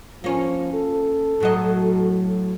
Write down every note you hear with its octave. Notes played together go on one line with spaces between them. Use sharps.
F3 A#3 C#4
A4
A2 F#3 D#5